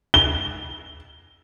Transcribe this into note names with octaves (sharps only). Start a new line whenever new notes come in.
G7